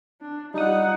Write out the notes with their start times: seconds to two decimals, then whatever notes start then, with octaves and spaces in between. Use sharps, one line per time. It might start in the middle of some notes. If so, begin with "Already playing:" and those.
0.22 D4
0.54 G3 D#4 F4 F#5 D#6